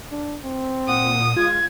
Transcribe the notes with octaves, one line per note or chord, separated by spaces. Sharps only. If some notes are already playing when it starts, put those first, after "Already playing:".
D4
C4
A#2 F#5 D#6
G#3 F4 G#6